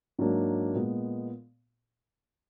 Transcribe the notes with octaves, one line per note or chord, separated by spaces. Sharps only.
G#2 F#3 A#3 D4
A#2 G#3 B3